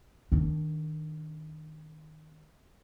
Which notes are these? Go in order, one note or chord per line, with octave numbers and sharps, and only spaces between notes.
D#3 D4